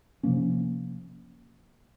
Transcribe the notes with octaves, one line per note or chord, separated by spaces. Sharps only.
C3 F3 A#3 C#4